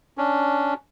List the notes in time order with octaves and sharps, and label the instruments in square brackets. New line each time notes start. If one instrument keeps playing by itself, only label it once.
[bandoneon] C#4 D4